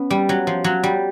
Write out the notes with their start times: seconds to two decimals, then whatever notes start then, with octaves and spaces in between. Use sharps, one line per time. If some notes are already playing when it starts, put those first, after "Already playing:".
Already playing: B3 C#4
0.10 G3
0.29 F#3
0.47 F3
0.64 F#3
0.83 G3